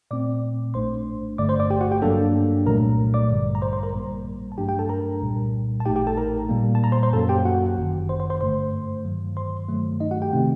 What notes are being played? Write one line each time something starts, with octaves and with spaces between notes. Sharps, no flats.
A#2 A3 C4 D5 D6
A#1 A2 A3 D4 C5 C6
G1 G2 D3 A3 D5 D6
C5 C6
D5 D6
G4 G5
F#4 F#5
G4 G5
G2 F#3 A#3 D4 A4 A5
C2 A#2 F#3 A3 A#4 A#5
D5 D6
A1 G2 D3 G3
A#5
C5 C6
C5 C6
A#4 A#5
A#1 A2 G3 A#3
A5
G2 F#3 A3 D4 G4 G5
G4 G5
A4 A5
A#4 A#5
C2 A#2 G3
A5
A1 A2 A3 D#4 G4 G5
G4 G5
A4 A5
A#4 A#5
A#2 G3 A#3
A5
A#5
C5 C6
C5 C6
F#2 F#3 A#3 A4 A5
G4 G5
F#4 F#5
G1 F#2 D#3
C5 C6
C5 C6
C5 C6
G2 D3 A3 C5 C6
G2 D#3 F#3
C5 C6
G2 D#3 F#3 A3
D#4 D#5
F#4 F#5
G4 G5
C3 D#3 A3 C4